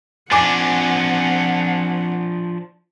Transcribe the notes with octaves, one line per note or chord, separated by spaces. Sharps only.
F3 C4 D4 F#5 G#5 D6